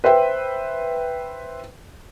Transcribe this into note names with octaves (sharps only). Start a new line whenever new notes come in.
B4 C5 E5 G5